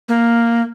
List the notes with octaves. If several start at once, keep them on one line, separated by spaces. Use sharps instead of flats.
A#3